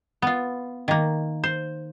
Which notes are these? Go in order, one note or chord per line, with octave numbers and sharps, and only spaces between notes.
B3 F4
D#3 A#3
C5